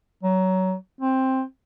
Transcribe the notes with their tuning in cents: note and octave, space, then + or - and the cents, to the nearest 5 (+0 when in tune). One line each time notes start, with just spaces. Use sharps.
F#3 +20
C4 +10